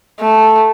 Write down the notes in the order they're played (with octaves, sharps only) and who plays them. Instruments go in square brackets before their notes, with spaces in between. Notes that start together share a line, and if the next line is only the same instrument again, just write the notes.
[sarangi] A3